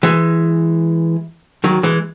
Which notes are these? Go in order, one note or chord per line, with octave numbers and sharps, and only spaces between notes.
E3 G#3
D#3 F#3
E3 G#3